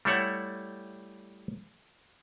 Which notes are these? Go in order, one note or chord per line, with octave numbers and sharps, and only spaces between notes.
G3 A3 E4 A4 C#5 F#5